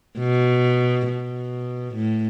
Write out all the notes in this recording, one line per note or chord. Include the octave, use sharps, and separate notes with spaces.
B2
B2
A2